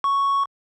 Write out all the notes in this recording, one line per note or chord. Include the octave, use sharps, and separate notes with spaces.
C#6